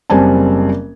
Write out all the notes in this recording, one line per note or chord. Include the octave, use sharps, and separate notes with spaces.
F#1 G3 C4 D5 G#5 A5